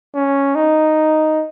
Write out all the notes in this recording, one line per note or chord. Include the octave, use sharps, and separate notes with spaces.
C#4
D#4